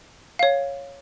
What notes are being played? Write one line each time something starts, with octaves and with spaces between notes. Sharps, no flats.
C#5 F5